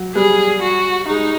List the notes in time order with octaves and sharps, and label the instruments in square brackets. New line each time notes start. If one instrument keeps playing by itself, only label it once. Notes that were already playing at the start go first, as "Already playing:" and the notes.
Already playing: [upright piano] F#3
[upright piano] G3 [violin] G#4
[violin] F#4
[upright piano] G#3 [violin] D#4